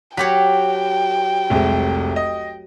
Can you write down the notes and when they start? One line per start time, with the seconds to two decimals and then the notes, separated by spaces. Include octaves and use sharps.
0.17 F#3 G4 C#5 G5 B6
1.50 F1 C2 G#3
2.16 D#5